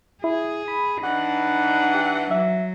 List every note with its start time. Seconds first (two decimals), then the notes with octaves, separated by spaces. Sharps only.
0.24 E4 G#4
0.68 B5
1.04 E3 D4 D#4 F#5
1.94 G4
2.31 F#3 E5